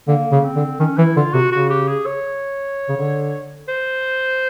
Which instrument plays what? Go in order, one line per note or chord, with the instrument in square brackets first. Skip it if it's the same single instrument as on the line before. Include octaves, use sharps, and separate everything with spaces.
[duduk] D3 [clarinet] A#3
[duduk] C#3
[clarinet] C4
[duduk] D3
[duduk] D#3 [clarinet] C#4
[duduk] E3 [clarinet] E4
[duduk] D3 [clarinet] F4
[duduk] C3 [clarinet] F#4
[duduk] C#3 [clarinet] F#4
[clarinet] G4
G#4
C#5
[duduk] C#3
D3
[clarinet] C5